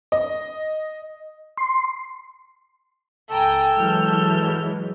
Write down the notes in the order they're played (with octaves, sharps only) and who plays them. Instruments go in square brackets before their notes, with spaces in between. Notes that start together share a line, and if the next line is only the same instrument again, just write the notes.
[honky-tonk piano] D#5
[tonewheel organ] C6
[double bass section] C#2 [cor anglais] A4 [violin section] G5 G#5 A#5
[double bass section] E3 F#3 G#3 [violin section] F6 G6